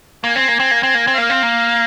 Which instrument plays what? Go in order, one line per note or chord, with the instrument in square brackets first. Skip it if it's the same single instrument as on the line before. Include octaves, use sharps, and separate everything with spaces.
[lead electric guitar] A#3 [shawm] G#5
[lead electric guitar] C4
A#3
C4
A#3
C4
A#3
C4
[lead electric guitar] A#3 [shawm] F5
[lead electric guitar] C4
A#3